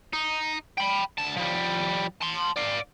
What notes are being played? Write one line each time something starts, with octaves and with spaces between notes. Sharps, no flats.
D#4
G5 B5
D2 A5
F3 G3
A5 C6
D5 F5